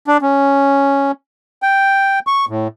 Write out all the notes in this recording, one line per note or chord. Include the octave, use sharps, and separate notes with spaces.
D4
C#4
G5
C#6
A2